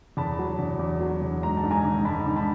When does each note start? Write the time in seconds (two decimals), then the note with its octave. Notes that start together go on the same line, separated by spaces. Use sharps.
0.17 E2 A5 B5
0.39 F#3
0.59 E2
0.79 E2
1.01 F#3
1.22 E2
1.43 G#2 A#5
1.57 A5
1.63 G#2
1.71 G#5 A#5
1.85 D#3
2.05 G#2 A5 B5
2.26 D#3
2.36 A5 B5